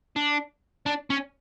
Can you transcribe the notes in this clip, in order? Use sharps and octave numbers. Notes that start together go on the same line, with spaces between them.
D4
D4
C#4